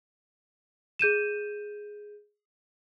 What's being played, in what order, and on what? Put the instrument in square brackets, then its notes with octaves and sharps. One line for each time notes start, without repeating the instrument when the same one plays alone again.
[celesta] G#4 G6 D#7 E7